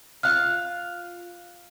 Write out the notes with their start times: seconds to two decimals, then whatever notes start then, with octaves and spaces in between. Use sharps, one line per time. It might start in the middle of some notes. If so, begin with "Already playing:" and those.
0.23 F4 F5 F6 F#6